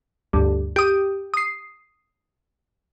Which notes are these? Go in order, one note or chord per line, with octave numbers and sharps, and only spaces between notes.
D2 G2
G4 D#6
D#6 C7